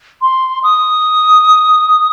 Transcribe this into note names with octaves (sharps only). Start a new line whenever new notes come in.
C6
D#6